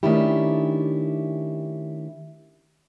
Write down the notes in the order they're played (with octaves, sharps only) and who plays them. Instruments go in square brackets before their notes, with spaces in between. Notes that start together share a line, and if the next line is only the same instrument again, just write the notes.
[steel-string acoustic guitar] D#3 A3 C#4 D4 E4 G4